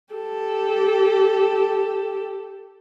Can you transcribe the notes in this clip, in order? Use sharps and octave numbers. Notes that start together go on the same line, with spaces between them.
G4 A4